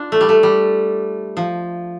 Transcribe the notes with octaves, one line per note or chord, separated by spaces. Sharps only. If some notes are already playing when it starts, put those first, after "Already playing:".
Already playing: D4 F4
A3
G3
A3
G3
F3